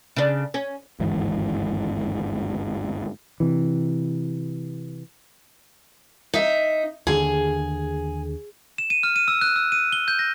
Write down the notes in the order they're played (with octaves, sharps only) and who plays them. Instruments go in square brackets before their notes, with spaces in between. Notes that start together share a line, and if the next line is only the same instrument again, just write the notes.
[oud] C#3 D4
C#4
[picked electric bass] G1 D#2 G#2 E3
[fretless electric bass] C3 E3
[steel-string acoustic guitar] D#4 E5
[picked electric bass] D#2 D3 [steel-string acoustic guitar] G#4
[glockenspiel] E7
D#7
F6
D#7
E6
F#6
E6
D#7
G7
G6
A#6